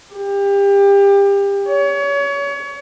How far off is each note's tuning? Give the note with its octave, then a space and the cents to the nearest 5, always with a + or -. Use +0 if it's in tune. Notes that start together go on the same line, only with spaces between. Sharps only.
G4 +30
C#5 +30